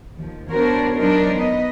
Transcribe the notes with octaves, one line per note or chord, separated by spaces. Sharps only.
D#2 F3
B3 D4 F#4 A#4 C5 C#5
F#3 D4 D#4 A#4 C5
B3 B4 D#5